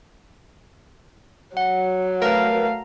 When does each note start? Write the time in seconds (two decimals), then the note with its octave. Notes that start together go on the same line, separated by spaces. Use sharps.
1.57 F#3 F#5
2.22 A3 A#4 B4 F5 A#5